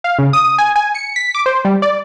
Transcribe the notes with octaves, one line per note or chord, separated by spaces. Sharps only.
F5
C#3
D#6
G#5
G#5
C#7
B6
D6
C5
G3
D5